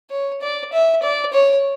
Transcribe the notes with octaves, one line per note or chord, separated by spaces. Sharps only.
C#5
D5
E5
D5
C#5